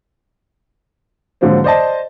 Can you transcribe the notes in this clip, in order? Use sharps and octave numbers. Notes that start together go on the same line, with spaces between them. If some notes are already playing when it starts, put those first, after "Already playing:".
G#2 D3 F3 F#3 A#3 C4
C5 D5 D#5 A5